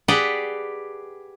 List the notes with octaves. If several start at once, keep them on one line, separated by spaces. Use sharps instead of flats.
G4 G#4 B4 D5 F#5 G5